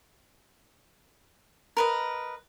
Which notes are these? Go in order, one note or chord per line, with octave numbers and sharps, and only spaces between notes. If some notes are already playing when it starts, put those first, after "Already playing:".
A#4 B4 D#5